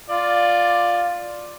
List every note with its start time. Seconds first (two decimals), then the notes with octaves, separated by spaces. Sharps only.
0.09 F4 D5